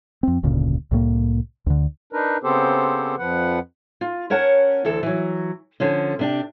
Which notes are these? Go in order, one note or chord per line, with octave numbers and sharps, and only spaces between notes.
F2 C4
F1 D2 A#2 C#3
C2 A2 A#3
D2 D3
D4 D#4 A#4 B4
C#3 B3 C4 G4 A4 C5
F2 F3 B4 F#5
F4
C#4 A#4 C#5 F#5 A5
D2 E3 A4
E3 F#3
D3 F3 C#4
C3 D4 G4